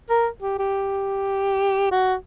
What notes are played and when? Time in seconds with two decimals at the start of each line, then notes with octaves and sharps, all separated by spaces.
0.10 A#4
0.42 G4
0.59 G4
1.91 F#4